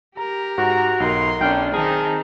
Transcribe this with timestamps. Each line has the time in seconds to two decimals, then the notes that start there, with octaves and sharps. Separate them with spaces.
0.17 G4 A#4 A#5
0.58 G#2 F#4 A#5
1.00 B1 D#4 A#4 B5 C6
1.40 B1 C#4 D4 G5 F6
1.73 D#3 C4 D#4 G#4 A5 A#5